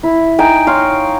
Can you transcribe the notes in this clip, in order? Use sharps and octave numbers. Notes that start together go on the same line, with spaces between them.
E4
D#4 G5 G#5
C#5 F5 C6